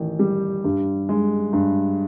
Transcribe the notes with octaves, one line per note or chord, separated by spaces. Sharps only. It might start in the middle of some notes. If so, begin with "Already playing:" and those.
Already playing: A1 D#3
G3
G2
G#3
G2